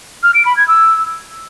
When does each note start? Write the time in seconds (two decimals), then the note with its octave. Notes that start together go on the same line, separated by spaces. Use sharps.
0.23 F6
0.34 D7
0.45 B5
0.57 G#6
0.68 E6